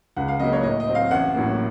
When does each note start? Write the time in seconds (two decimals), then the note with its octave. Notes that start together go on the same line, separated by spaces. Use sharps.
0.16 C#2 F#5
0.28 F5
0.40 C#3 F#3 A#3 D#5
0.52 C#5
0.63 A2 D#5
0.80 D#5
0.87 F#3 C4
0.95 F5
1.11 A1 F#5
1.35 A2 F#3 A#3